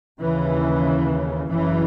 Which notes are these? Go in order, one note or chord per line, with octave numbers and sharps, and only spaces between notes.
D#2 C#3 E3
F#1 F#2 C#3 E3